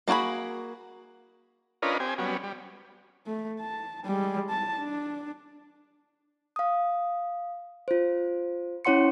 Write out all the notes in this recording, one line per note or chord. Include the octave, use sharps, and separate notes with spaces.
A#3 D4 F#4 G#4 B5
C#4 D4 F4 A#4 B4 D#5
C4 G4 G#5
F#3 G3 B3 C#4
G3
A3
A5
G3 G#3
A5
D4
F5 D#6
F4 C5
C#4 E4 C#5 F#5 C6 C#7